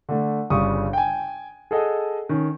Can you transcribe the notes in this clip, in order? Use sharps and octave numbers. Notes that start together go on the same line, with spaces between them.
D3 A3
G1 C#3 G3 C#6 D#6
G5 G#5
G#4 A4 D#5 F#5
D#3 C#4